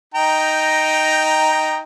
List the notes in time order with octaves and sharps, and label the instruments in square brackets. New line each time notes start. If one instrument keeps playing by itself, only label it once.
[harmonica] D#4 G5 A#5